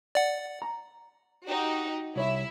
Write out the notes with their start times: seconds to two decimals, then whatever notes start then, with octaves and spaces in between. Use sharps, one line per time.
0.15 D5 F#5
0.62 A#5
1.45 D#4 F#4 G4
2.16 C2 E4 C#5 E5